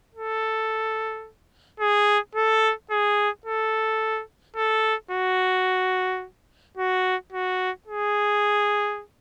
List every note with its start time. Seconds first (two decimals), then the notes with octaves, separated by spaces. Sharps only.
0.15 A4
1.80 G#4
2.35 A4
2.91 G#4
3.46 A4
4.56 A4
5.11 F#4
6.77 F#4
7.32 F#4
7.87 G#4